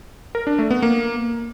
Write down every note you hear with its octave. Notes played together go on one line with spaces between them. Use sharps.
A#4
D4
A3
B3
A#3